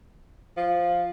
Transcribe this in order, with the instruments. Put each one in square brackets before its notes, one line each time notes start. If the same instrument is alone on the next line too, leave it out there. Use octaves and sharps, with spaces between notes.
[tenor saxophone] F3